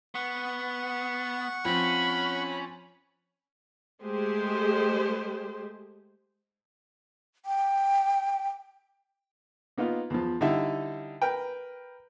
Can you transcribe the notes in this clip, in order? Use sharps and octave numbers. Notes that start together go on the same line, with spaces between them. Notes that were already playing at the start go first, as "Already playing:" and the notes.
B3 F#5 C#6
F3 C4 C#4 B5
G#3 A3 G4 G#4 C5
G5
A#3 B3 D#4 F4
E2 F3
D3 G3 D#4 E4
A#4 B4 G5